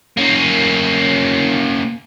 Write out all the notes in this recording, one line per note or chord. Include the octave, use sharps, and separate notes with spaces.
A#3 C#4